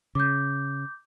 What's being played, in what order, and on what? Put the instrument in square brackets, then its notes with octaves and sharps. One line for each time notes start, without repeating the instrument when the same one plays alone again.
[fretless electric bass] C#3 [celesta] D6 G6